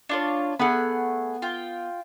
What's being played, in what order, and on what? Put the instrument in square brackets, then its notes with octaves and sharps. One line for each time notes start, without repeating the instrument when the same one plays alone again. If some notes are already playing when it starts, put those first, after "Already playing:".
[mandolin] D4 F4 C#5
[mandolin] A3 G#4 B5 [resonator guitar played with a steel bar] B3 F#5
[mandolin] F4 G5